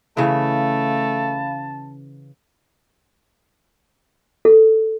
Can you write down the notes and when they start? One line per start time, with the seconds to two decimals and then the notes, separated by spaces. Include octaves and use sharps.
0.17 C#3 E3 A3 F5 A5 B5
4.45 A4